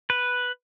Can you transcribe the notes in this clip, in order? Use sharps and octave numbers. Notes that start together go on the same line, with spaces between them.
B4